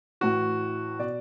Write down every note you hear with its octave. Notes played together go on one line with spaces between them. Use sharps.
A2 E3 F#4
B2 D5